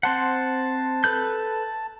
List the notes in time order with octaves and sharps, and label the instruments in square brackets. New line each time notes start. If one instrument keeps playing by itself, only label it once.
[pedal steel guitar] C4 C5 F#5 [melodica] A5
[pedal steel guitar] A4 B4 G6